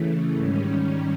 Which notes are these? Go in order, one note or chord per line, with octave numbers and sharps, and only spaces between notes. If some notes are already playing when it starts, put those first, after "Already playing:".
Already playing: C#3 E3 A3
G#2 D#3 G3 C#4